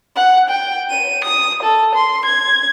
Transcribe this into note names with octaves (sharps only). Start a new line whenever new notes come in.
F#5
G5
D#7
D#6
A4
C6
G#6